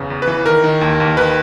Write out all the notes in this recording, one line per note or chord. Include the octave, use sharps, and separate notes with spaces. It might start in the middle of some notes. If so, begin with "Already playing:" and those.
Already playing: E2 C#3 E3
E2
B4
E3
D#3 A#4
D#3
D#2
D#2
D#3 B4